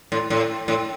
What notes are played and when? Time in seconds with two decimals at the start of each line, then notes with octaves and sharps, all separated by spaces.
0.12 A2
0.30 A2
0.68 A2